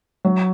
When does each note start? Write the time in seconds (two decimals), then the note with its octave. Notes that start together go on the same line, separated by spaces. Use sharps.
0.25 F#3